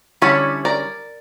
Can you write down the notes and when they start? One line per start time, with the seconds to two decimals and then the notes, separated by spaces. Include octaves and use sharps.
0.22 D3 G3 C#4 E4 A4 C#5
0.65 A#4 D5